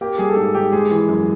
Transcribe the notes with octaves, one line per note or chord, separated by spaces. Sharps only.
A#3 G4
G3 G#4
A4
G#2 G#4
D#3 G4
G#3 G#4
E3
F#2